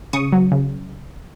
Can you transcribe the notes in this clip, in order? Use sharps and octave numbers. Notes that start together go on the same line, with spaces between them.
C#3 C#6 D#6
F#3
C#3